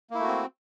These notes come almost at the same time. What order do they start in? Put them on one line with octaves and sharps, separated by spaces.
A#3 E4 A3 F#4 C4